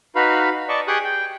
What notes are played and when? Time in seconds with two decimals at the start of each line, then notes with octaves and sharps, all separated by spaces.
0.15 D#4 F#4 B4 F5 B5
0.69 D5 D#5 A5 C#6
0.88 G4 G#4 G5 C#6 D#6 F#6
1.04 G5